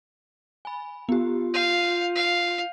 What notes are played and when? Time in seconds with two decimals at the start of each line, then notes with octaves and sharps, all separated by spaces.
0.65 G#5 B5
1.09 B3 F4 G4
1.54 F5 G6 D#7 F7
2.15 F5